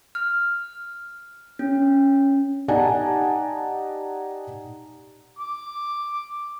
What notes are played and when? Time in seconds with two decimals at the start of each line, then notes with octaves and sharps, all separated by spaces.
0.15 F6
1.59 C#4
2.68 D#4 G4 D5 F#5 G#5 A5
5.39 D6